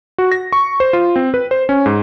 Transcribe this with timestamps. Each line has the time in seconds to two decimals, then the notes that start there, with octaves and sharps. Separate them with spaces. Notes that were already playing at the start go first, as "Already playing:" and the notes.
0.18 F#4
0.32 A#6
0.53 C#6
0.80 C5
0.93 F4
1.16 C4
1.34 B4
1.51 C5
1.69 C#4
1.86 G#2